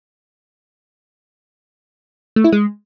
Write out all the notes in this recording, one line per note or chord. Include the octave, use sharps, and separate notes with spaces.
A3
E4
G#3